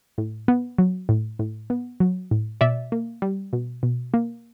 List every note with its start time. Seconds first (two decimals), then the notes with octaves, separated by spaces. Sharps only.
0.18 A2
0.48 B3
0.78 F#3
1.09 A2
1.39 A2
1.70 B3
2.00 F#3
2.31 A2
2.61 B2 D5 E5
2.92 A#3
3.22 G3
3.53 B2
3.83 B2
4.14 A#3